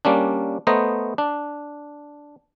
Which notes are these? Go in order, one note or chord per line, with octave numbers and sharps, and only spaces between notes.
G3 A#3 C#4 D4
A3 B3 C5 D#5 A#5
D4